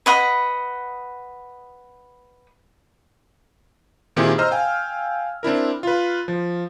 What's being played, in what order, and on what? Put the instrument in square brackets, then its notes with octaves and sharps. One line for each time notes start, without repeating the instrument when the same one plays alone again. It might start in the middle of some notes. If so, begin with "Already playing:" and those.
[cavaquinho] B4 D#5 F#5
[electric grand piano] A#2 D#3 C4 E4 G4 G#4
C5 D#5 A#5 E6 F6
F5 G5 G#5
C4 D4 E4 A#4
F4 B4
F3